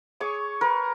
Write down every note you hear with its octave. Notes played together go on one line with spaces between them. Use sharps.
G#4 C#5 C#6 D6
A#4 B4